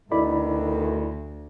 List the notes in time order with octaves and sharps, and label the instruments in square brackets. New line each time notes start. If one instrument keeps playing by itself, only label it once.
[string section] D2 [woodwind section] B2 D3 D#3 [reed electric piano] E4 D5 B5